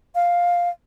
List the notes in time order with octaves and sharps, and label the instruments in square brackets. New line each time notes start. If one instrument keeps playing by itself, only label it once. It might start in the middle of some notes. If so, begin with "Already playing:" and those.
[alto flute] F5